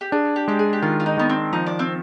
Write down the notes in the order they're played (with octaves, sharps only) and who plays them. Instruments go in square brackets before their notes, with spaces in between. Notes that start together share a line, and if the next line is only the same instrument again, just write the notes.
[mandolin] G4
[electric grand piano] D4 [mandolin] G#4
[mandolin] G4
[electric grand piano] G#3 [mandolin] G4
[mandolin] G#4
G4
[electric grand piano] D#3 [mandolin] F4
[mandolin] F4
D#4
[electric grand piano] D#3 [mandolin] B3
[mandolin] C4
[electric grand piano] F3 [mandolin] D#4
[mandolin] D4
C4